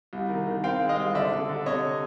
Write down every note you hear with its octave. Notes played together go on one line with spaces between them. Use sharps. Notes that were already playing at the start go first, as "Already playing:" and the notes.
C2
D#3
D#3
C4 F5 G5
G#3
D#5 F5
C2
D3 D5 E5
D3
D3
C3 C#5 D#5